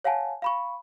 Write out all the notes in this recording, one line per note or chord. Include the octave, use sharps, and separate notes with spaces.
C#5 F5 F#5 G#5 A5
F5 B5 C#6